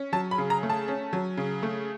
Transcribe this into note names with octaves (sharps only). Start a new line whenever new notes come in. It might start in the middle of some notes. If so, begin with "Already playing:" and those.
Already playing: C#4
F#3 A5
B5
C#3
A#5
A3
A5
C#4
F#3
C#3
A3